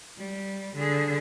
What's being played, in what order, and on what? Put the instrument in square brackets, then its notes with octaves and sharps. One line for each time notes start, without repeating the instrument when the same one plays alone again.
[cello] G3
D3 G#4